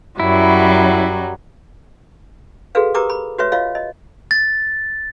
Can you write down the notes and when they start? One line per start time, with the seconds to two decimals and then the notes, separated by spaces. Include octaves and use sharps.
0.20 F#2 F#3 G3 E4
2.75 F#4 G#4 A4 B4 F5
2.94 G4 A#4 B4 A#5 D6 D#6
3.09 B5
3.39 F#4 B4 C#5 E5
3.52 F4 C#5 D#5 F5
3.75 D#5
4.31 A6